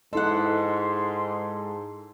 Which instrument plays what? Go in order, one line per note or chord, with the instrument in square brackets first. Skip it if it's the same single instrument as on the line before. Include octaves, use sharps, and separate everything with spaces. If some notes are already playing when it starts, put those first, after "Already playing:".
[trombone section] G#2 [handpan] E4 D#5 [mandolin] A4 F#5 [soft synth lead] C6